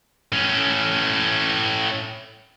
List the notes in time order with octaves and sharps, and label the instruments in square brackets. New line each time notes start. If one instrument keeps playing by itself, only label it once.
[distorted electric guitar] A2 C#4